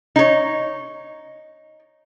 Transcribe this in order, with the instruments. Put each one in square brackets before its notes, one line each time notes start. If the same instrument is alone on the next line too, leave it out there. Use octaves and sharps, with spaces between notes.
[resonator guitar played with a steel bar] D#4 C#5